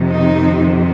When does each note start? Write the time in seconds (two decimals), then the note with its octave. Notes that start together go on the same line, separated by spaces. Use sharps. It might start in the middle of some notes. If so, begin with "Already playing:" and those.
Already playing: F2 C3 D#3
0.10 D#4